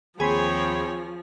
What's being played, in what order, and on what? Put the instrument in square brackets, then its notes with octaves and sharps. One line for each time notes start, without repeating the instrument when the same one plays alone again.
[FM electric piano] D#2 B5 C6 [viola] F3 [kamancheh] C4 C#5 [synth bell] G#4 G#5